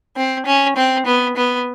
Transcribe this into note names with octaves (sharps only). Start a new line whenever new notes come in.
C4
C#4
C4
B3
B3